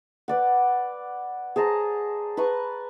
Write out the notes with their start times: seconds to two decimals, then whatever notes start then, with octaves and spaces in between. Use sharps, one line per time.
0.28 B4 D5 F#5
1.56 G#4 C5 A5 A#5
2.37 B4 A5 A#5 C#6